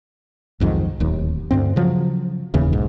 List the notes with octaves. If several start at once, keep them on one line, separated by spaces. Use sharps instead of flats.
B1 F2 G#2 D#3
D1 D#2
D2 G2 C4
C#3 F3 F#3
F1 D#2 C#3 E3
B1 G#2